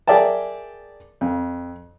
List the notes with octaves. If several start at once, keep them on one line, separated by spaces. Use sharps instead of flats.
G#4 A#4 D5 E5 G5 A5
F2